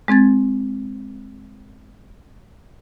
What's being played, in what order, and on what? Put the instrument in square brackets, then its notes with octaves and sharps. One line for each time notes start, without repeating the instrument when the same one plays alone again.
[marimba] G#3 C4 G#6 A6